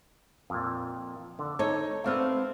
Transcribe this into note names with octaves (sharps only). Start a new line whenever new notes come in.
F2 A#2
D3
D#4 A4 C#5
A3 B3 C4 D4 F5